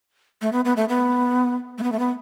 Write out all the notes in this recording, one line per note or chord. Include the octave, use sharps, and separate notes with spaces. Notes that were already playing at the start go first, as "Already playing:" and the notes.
A3
B3
B3
A3
B3
A3
B3
A3
B3